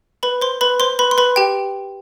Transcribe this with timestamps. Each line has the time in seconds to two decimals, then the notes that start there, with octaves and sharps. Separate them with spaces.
0.23 B4 B5
0.42 C5 C6
0.61 B4 B5
0.80 C5 C6
0.99 B4 B5
1.11 C6
1.18 B4 B5
1.36 G4 G5